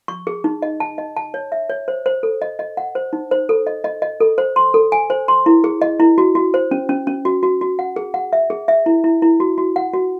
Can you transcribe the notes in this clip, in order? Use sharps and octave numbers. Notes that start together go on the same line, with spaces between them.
C#6
G#4
D#4
D#5
A5
D#5
A5
C#5
E5
C#5
C5
C5
A4
D#5
D#5
F#5
C5
D#4
C5
A4
D#5
D#5
D#5
A4
C5
C6
A4
G#5
C5
C6
E4
G#4
D#5
E4
F#4
F#4
C5
C#4
C#4
C#4
F#4
F#4
F#4
F#5
G#4
F#5
E5
G#4
E5
E4
E4
E4
F#4
F#4
F#5
F#4